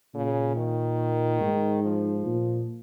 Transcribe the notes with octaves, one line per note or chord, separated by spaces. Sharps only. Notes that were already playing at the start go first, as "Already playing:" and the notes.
A#2 C#3
D#3
G#2
F3
A#2